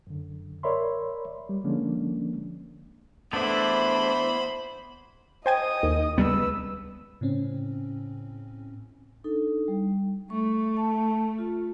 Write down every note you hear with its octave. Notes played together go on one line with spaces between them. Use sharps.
F#2 D3
A#4 C#5 D5 E5 B5 C6
G3
D3 F3 G#3 A#3 C#4 D4
A3 B3 D4 E4 C5 E5 B5
C5 D#5 G5 G#5 D#6
D#2
C#2 G3 B3 B4 E6
A2 C#3 C4 C#4
D4 D#4 A4
G3
A3 C#6
A5
F4